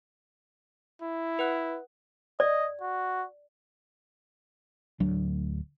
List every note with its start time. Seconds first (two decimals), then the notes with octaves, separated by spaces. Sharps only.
1.02 E4
1.39 B4 F#5 F#6
2.40 D5 D#5
2.81 F#4
5.00 D1 D2 F#3 D4